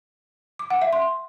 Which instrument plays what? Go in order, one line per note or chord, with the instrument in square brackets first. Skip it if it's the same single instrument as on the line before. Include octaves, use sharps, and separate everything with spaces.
[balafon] D6
F#5
E5
C6